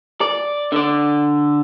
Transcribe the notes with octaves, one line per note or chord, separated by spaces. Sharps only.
D5
D3 D5